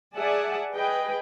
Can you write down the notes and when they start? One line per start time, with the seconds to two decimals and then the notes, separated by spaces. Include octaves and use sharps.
0.16 G#4 D5 E5 F#5 G#5 A5
0.74 G#4 B4 D#5 G5